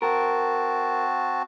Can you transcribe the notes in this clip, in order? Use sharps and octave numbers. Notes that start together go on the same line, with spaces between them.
C4 F#4 A#4 A5